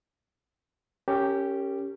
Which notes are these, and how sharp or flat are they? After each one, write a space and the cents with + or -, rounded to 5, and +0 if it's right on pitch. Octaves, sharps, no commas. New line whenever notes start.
C#4 +0 G4 +0 A#4 -35